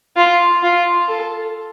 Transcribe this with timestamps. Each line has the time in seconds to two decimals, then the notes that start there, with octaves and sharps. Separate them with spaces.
0.16 F4
0.63 F4
1.08 A4